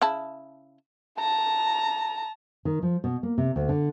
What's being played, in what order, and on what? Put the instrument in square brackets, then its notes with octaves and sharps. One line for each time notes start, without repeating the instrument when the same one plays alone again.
[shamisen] C#3 E4 A5
[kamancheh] A5 A#5
[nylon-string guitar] D#3
F3
B2
A#3
C3
D2
D3